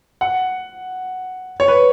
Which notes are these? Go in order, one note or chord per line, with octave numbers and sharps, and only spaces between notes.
F#5
C#5
B4